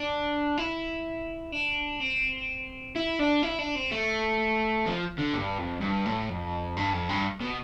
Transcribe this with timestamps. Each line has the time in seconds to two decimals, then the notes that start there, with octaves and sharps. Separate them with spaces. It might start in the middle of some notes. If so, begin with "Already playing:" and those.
Already playing: D4
0.58 E4
1.52 D4
2.00 C4
2.96 E4
3.20 D4
3.43 E4
3.59 D4
3.76 C4
3.91 A3
4.86 F3
5.18 D3
5.33 G2
5.58 F2
5.81 G2
6.06 A2
6.30 F2
6.77 G2
6.93 F2
7.09 G2
7.40 B2